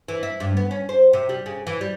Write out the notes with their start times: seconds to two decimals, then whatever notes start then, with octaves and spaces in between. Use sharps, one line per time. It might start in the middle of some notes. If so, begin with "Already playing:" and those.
0.08 E3
0.23 E4
0.40 G2
0.57 B3
0.71 C#4
0.89 C5
1.13 C3
1.29 G3
1.46 C#3
1.67 E3
1.81 G3